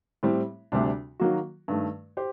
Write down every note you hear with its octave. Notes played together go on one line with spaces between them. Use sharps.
A2 G3 C4
D2 C3 G3 D4
D#3 F#3 A#3 F#4
G2 D#3 A3
G4 C5